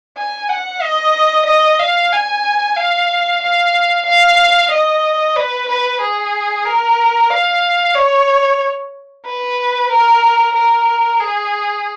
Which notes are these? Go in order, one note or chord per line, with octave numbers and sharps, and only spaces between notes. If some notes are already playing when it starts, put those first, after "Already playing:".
G#5
F#5
D#5
D#5
F5
G#5
F5
F5
F5
D#5
B4
B4
G#4
A#4
F5
C#5
B4
A#4
A#4
G#4